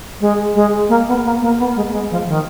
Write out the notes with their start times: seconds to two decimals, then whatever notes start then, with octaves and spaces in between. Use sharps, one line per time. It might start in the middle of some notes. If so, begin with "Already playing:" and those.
0.20 G#3
0.55 G#3
0.89 A#3
1.07 B3
1.24 A#3
1.42 A#3
1.59 B3
1.76 G#3
1.88 A#3
1.93 G#3
2.11 F3
2.28 D#3